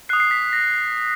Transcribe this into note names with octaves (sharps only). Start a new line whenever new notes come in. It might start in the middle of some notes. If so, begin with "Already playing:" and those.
D#6 F#6 C7
C7
B6
A#6